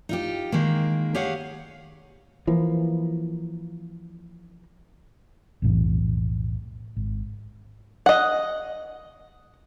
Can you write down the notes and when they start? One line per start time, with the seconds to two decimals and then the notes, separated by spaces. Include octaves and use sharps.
0.09 D#4 F4 G4
0.52 D#3 G#3 A#3
1.15 G4 G#4 C#5 F5 F#5
2.47 E3 F3 A#3
5.62 B1 F2 A2 E3
6.96 G#1
8.06 D#5 F#5